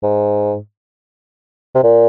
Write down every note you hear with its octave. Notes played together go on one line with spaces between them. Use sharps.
G#2
C3
A#2